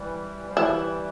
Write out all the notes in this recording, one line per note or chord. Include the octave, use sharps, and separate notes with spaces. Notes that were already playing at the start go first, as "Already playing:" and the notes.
Already playing: E3 G3
F3
E3 G3 E4